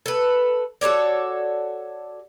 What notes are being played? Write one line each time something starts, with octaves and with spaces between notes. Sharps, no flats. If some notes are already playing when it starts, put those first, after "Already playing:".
A4 B4
F#4 A4 C#5 D5